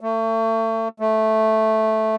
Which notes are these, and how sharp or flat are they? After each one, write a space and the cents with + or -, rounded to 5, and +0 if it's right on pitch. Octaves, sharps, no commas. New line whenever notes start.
A3 +35
A3 -5